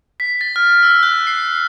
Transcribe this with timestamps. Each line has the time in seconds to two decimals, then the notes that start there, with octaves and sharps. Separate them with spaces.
0.20 B6
0.41 A6
0.56 F6
0.83 E6
1.03 F#6
1.27 C7